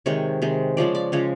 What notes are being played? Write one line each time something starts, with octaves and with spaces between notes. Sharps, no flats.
C3 D#3 G#3 C#5
C3 D#3 G#3
C#3 F3 G#3 C#4 D5
D5
C#3 F3 G#3 C#4 C#5